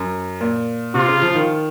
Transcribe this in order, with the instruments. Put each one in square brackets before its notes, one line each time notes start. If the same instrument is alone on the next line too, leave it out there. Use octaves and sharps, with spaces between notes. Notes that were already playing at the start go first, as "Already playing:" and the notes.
Already playing: [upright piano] F#2
A#2
[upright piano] C3 [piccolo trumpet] F4
[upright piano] C#3
F3
D#3